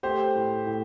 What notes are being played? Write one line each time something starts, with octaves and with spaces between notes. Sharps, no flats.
A3 G4 C5
A2
A2